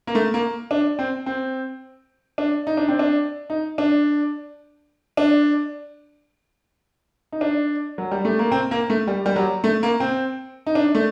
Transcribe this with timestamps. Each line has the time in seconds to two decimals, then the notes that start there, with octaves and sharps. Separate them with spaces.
0.07 A#3
0.15 A3
0.34 A#3
0.71 D4
0.99 C4
1.26 C4
2.38 D4
2.67 D#4
2.77 D4
2.88 C4
2.99 D4
3.50 D#4
3.78 D4
5.17 D4
7.32 D#4
7.41 D4
7.98 F#3
8.11 G3
8.25 A3
8.39 A#3
8.52 C4
8.71 A#3
8.90 A3
9.07 G3
9.26 G3
9.36 F#3
9.64 A3
9.83 A#3
10.00 C4
10.67 D#4
10.75 D4
10.95 A3